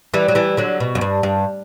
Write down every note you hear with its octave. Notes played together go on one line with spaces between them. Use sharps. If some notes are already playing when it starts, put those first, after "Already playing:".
E3 G3
F#3
E3 G3
D3 F#3
B2
F#2
G2
G2